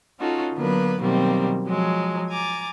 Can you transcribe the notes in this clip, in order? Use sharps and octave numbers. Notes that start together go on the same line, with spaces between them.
C#4 D#4 F4 F#4 A4
D3 F#3 A#3 B3 B4
B2 D#3 F#3 G3 A#3 C4
F3 F#3 G#3
G#5 A#5 D6 A6